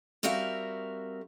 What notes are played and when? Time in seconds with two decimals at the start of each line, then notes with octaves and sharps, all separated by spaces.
0.23 G3 C4 F#4 A#4 E5 F5